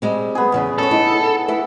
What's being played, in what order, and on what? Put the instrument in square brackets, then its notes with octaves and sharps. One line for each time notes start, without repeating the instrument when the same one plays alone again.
[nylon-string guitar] G3 G#3 C4
[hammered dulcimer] B3 G#4
[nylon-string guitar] E2 C#3 E5
[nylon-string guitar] C#4 C#5 [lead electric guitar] A4
[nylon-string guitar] D#4 E4
[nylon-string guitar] E4 B4 [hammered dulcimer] E5